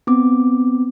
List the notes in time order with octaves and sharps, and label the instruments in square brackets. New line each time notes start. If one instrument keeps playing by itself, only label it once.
[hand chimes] B3 C4 D6